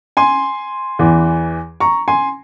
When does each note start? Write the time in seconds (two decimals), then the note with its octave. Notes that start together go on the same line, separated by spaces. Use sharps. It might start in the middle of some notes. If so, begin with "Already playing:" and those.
0.17 G#5 C6
0.99 E2 E3
1.80 A#5 C#6
2.08 G#5 C6